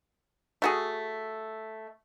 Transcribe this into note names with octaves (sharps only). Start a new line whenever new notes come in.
A3 F#4 G#4